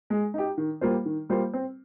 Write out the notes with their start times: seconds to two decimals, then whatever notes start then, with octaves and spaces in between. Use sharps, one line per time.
0.10 G#3
0.34 D#4 G4
0.58 D#3
0.81 G3 A#3 F4 C5
1.06 D#3
1.29 G3 A#3 F4 C5
1.54 C4